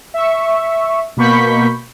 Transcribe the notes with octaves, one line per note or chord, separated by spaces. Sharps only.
E5 C#6
B2 A#3 B5 C#6 G6 B6